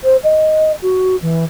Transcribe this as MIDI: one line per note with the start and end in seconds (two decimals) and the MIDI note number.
0.04 0.16 72
0.24 0.72 75
0.82 1.16 66
1.22 1.45 52